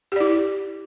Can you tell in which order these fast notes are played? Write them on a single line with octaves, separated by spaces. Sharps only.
G4 D5 E4